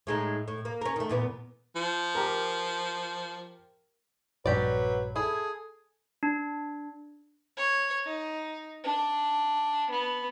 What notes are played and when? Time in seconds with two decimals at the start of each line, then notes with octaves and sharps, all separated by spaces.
0.07 A2 G#3 D#4
0.48 A2
0.65 A#3
0.81 C#4 A#4
0.96 D#3 A3
1.09 E2 A#2 B3
1.76 F3
2.15 G4 A#4
4.46 A#1 G2 F#3 C#4 G4 B4 D5
5.16 E4 G#4 A4
6.23 D4
7.57 C#5
8.06 D#4
8.84 D4
9.90 B3